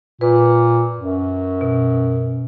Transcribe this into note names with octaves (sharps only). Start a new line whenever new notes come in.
A#2 B4
F#2
B2